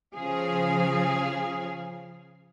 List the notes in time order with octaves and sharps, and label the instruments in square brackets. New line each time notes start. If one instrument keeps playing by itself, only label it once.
[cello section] C#3 F3 G#4 F5